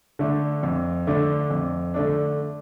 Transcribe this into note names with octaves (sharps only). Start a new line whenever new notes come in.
D3 A3 D4
F2
D3 A3 D4
F2
D3 A3 D4